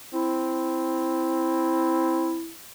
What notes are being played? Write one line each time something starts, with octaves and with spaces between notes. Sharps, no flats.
C4 E4